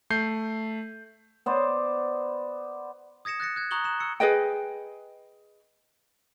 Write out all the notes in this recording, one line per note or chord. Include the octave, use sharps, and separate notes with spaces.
A3 G6 C7
B3 C5 D5
D#6 G#6 A#6 C#7 E7
F#6 A6 A#6 C#7
F#6 G#6
A#5 C#6 D#6 F#6 F#7 G7
F#6 E7
E6 C#7
G#4 B4 D#5 G5